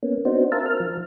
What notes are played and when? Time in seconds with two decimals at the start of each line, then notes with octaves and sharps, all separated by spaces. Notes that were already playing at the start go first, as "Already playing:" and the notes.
0.03 A#3 B3 C#4
0.25 B3 C4 D4 D#4 F#4 C5
0.52 A#4 C5 E5 F5 A5
0.66 A#4 F6
0.80 F3